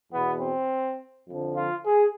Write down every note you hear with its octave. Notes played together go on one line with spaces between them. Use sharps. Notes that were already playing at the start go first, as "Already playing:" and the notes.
E2 B2 B3
C4
F2 D3 F3
F4
G#4